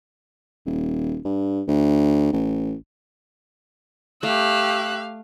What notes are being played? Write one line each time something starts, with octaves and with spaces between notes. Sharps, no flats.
D#1
G2
D2
A1
A3 G4 F5 E6 F#6